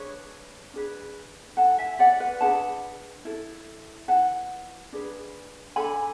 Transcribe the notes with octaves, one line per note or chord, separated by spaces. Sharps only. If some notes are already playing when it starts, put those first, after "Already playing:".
Already playing: D4 G#4 B4 C#5
D4 G#4 B4
E4 A4 F#5 A5
E5 G#5
D5 F#5
B4
D4 G#4 B4 F#5 A5
E4 A4
E4 B4 F#5 A5
D4 G#4 B4
D4 A4 G#5 B5